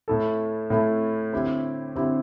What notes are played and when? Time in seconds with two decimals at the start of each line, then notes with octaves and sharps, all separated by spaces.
0.08 A2 A3 E4 A4
0.70 A2 A3 E4 A4
1.33 D3 C4 E4 G4
1.95 D3 C4 E4 G4